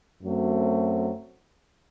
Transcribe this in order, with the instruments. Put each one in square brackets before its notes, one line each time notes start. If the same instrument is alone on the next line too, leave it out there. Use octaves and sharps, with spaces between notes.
[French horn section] F#2 F#3 A3 C4